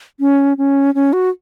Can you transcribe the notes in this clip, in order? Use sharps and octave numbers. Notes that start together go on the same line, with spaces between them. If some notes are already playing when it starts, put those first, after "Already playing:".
C#4
C#4
C#4
F#4